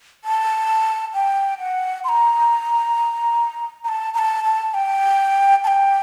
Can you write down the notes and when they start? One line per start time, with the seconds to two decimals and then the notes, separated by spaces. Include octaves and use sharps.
0.24 A5
1.14 G5
1.59 F#5
2.04 C6
2.09 A#5
3.84 A#5
3.88 A5
4.14 A#5
4.18 A5
4.44 A5
4.74 G5
5.64 A5
5.67 G5